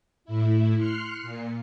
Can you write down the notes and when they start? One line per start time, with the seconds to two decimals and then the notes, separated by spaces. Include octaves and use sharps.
0.25 A2 E4
0.77 C6 F6 F#6 C7 C#7
1.23 A#2